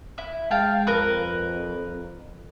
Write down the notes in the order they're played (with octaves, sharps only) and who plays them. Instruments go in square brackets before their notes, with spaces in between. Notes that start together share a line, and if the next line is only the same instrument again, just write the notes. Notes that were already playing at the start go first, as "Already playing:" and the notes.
[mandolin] E4
[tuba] G#3 [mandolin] F5 G5 A5
[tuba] F2 [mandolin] A#4 B4